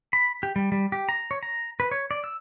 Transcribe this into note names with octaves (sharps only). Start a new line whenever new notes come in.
B5
G4
G3
G3
G4
A#5
C#5
A#5
B4
C#5
D5
E6